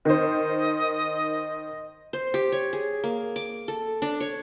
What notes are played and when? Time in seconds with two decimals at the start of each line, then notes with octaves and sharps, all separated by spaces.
0.05 D#3 C5 D#5
2.13 C5
2.34 G4
2.52 C#5
2.73 G#4
3.04 A#3
3.36 D6
3.68 A4
4.02 D4
4.20 C#5